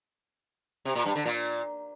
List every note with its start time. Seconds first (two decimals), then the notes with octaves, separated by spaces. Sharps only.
0.85 C3
0.95 A#2
1.05 G2
1.16 D3
1.26 A#2